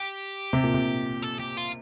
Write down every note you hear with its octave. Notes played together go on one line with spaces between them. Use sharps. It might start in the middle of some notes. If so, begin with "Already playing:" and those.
Already playing: G4
C3
A#2
C3
A4
G4
F4